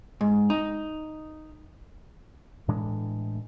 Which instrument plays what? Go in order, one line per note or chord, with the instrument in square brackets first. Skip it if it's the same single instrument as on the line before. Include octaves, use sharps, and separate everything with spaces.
[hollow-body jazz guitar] G#2
D#4
[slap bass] A2 E3 G#3 D4